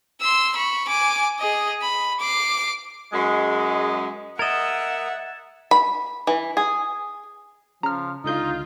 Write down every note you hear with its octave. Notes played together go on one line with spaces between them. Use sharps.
C6 E6
B5 C#6
G#5 D6
G#4 D#5
B5
D6 C7
F#2 F#3 G#3
A#4 D#5 E5 F#5 G#6 A6 E7
B5
E3
G#4
C#3 F3 A#5 F6
C#2 D3 D#4 F4 G6